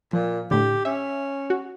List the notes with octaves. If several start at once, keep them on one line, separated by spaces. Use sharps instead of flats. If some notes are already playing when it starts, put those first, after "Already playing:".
A#2 F3
A2 D3 G4
C#4 E5
F#4